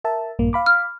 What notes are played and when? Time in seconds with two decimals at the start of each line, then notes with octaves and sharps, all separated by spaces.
0.04 A#4 E5 A5
0.39 A#1 G2 A#3
0.53 F5 B5 D6
0.66 F6